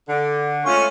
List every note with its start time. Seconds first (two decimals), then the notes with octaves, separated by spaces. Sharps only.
0.08 D3
0.66 G#3 A3 C#4 F4 G#5 C#6